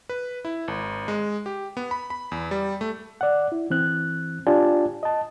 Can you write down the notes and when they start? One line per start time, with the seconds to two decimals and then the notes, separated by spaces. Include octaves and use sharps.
0.09 B4
0.45 E4
0.68 G#1
1.08 G#3
1.46 G4
1.77 B3
1.91 B5
2.10 B5
2.32 E2
2.51 G3
2.81 A3
3.21 D5 F#5
3.52 E4
3.70 E3 C4 F#6
4.47 D4 F4 G4 D5 G#5 A5
5.03 D#5 A5